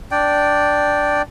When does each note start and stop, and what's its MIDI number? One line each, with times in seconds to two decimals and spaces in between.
0.11 1.22 62
0.11 1.22 74
0.11 1.22 79